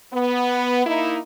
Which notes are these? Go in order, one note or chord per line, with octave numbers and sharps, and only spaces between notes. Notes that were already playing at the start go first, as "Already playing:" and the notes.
B3
A#3 D#4 E4